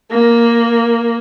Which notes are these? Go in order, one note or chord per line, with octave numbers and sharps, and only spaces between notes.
A#3